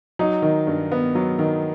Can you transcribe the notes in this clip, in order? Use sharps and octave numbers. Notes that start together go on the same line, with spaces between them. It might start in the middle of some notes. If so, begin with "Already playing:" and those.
F#3 D#4
D#3
G2
B3
F#3
D#3